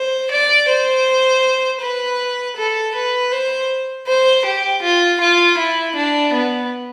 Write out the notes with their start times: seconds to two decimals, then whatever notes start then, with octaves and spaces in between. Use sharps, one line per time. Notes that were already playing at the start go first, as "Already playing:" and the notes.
Already playing: C5
0.31 D5
0.69 C5
1.81 B4
2.57 A4
2.95 B4
3.32 C5
4.07 C5
4.45 G4
4.82 F4
5.20 F4
5.58 E4
5.96 D4
6.33 B3